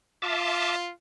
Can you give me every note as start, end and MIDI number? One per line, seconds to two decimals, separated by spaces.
0.22 0.89 65
0.22 0.76 76
0.22 0.76 81
0.22 0.76 86